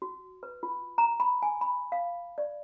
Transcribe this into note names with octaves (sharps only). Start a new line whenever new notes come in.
F#4
B4
F4
A#5
B5
G#5
B5
F5
D5